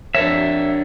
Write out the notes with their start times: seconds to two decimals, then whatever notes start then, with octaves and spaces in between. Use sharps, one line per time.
0.15 D4 A#4 C#5 E5